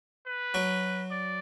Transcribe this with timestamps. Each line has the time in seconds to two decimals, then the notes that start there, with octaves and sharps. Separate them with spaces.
0.26 B4
0.54 F#3 F#4
1.11 D5